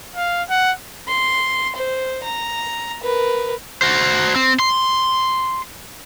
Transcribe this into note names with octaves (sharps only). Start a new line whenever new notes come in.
F5
F#5
C6
C5
A#5
A#4 B4
F#4 C5
C4
C6